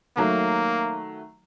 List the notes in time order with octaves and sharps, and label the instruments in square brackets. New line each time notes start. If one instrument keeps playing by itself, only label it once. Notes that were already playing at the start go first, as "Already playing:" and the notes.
[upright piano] D#3 F#3 A3 [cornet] A#3